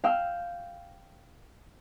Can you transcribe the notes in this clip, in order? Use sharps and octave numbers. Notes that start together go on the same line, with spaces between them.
F5 G5 E6